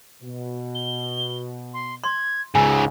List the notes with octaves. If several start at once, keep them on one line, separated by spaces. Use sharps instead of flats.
B2
G7
C6
C6 G#6
C#2 G#2 C#3 G#5 E6